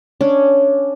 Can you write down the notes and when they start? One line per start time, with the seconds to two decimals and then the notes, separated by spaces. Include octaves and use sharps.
0.21 C#4 D4